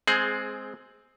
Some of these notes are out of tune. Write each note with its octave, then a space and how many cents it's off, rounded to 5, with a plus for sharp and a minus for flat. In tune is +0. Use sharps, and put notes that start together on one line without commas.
G#3 +0 C4 +0 G#4 +20